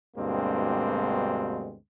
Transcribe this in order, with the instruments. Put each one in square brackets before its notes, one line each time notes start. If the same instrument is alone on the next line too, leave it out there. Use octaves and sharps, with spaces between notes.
[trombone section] D2 G2 B2 G#3 A#3 C4